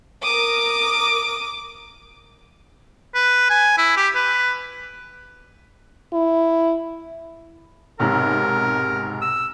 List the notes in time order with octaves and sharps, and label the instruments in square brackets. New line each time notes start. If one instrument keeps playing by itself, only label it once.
[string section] A#4 D#6 [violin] D6
[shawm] B4
G#5
E4
G4
B4
[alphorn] E4
[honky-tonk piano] B1 G#2 C3 [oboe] A#4
[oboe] E6